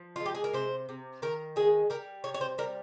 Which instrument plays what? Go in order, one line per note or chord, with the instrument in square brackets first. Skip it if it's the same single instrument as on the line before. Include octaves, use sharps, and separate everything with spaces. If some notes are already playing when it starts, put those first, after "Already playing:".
Already playing: [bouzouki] F3
G#3 F4
G4
G#4
A#4
C3 C5
C3
D#3 A#4
G#3 G#4
G3 A#4
C3 C#5
C#5
C5
G3 A#4